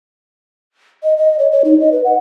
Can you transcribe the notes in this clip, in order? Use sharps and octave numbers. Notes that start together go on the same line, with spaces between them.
D#5
D#5
C#5
C#5
D#4
D#5
B4
F#5